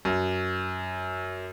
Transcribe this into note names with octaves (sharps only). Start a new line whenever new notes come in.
F#2